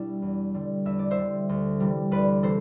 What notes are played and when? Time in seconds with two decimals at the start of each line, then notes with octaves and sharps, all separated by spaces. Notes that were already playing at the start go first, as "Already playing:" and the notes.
Already playing: B2 G3 D4 E4
0.22 E2
0.54 D3 G3
0.85 E2 E5
0.99 D5
1.11 C5 E5
1.16 D3 G3
1.49 D2
1.80 C3 E3 G3
2.11 D2 B4 D5
2.43 C3 E3 A4 C5